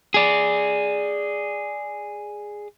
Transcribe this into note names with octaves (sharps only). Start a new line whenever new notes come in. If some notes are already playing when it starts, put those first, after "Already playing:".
G#4 D5